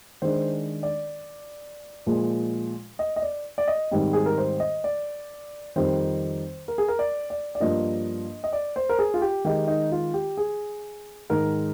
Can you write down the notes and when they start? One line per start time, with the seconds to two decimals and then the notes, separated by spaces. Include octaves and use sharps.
0.22 D#3 G#3 D4 C5
0.83 D5
2.06 A#2 F3 G#3
2.99 D#5
3.16 D#5
3.22 D5
3.58 D5
3.68 D#5
3.91 G#2 D#3 G3 C4 D#4
4.13 G#4
4.26 A#4
4.38 C5
4.60 D#5
4.84 D5
5.76 F2 D#3 G3 C4 D#4 C5
6.68 A#4
6.78 G#4
6.88 A#4
6.99 D5
7.30 D5
7.55 D5
7.60 G2 F3 A#3 D4 D#5
8.44 D#5
8.53 D5
8.76 C5
8.89 A#4
8.99 G#4
9.14 F4
9.22 G4
9.45 D#3 G#3 D#4 G4
9.68 D#4
9.92 F4
10.14 G4
10.37 G#4
11.30 G#2 D#3 G#3 A#4